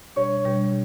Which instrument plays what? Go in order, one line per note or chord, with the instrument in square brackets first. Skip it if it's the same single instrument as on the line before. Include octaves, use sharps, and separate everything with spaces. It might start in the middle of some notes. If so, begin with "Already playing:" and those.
[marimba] B2 G3 D4 G4 [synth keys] C#5 C#6
[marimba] B2 G3 D4 G4